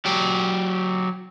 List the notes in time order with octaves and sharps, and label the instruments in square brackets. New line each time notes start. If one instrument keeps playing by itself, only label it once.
[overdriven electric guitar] F#3 G4